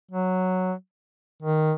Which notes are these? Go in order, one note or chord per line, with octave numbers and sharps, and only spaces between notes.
F#3
D#3